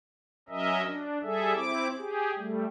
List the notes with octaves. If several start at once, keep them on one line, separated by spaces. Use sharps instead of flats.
F#3 C#4 A#4 D#5 E5
D4
G3 G#4 A4 E5
C4 E4 D6
G4 G#4
G3 A3